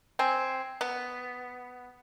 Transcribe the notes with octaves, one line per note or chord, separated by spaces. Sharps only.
C4 G#5
B3